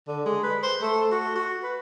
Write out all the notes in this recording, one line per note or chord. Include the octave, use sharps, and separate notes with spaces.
D3
G#3
B4
C5
A3
F#4
F#4
B4